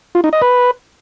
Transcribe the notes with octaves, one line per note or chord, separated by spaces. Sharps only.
F4
D#4
D#5
B4